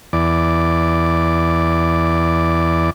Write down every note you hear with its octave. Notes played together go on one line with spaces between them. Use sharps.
E2 D5